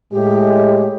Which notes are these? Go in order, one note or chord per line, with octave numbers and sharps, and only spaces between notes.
A2 G#3 G4